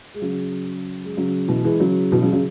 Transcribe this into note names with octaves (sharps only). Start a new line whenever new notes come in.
G#3
C#3 F#3
G#3
C#3 F#3
B2 E3
E3 G#3
C#3 F#3
B2 E3
C#3 F#3
C#3 F#3